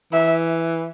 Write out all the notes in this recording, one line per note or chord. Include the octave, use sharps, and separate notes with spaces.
E3 E5